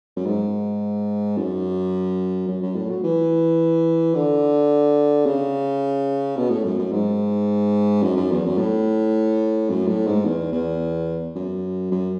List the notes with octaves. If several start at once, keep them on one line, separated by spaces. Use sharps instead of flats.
F#2
G#2
F#2
F#2
F#2
A2
F#3
E3
D3
C#3
B2
A2
F#2
F#2
G#2
F#2
F#2
E2
F#2
A2
F#2
A2
G#2
E2
E2
F#2
F#2